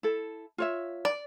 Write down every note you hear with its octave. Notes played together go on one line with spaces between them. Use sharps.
E4 A4
F4 C#5 E5
D5